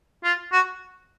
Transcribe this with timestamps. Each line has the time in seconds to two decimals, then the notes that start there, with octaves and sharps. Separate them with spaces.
0.24 F4
0.52 F#4